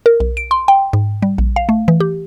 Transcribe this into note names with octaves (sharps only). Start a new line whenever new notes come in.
A#4
B1
D7
C6
G5
G#2
G3
A#1
F5
A3
E3
G4